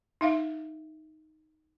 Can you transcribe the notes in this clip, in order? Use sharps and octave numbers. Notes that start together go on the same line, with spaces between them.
D#4 E5 F5